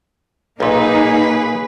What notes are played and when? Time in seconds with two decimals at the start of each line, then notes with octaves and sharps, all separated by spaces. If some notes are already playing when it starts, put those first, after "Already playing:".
0.60 B1 A#2 A#3 D#4 G#4 B4